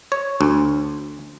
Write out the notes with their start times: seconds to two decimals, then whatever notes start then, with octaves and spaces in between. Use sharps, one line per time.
0.12 C#5
0.41 D2